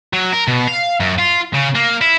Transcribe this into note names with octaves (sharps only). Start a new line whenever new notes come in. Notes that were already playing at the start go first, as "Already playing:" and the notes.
F#3
A#4
B2
F5
F#2
F4
C#3
A#3
E4